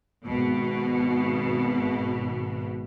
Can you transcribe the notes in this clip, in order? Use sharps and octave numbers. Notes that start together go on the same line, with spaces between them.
G#1 B2